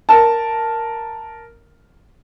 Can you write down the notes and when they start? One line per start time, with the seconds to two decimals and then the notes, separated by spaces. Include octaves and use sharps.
0.09 A#4 A5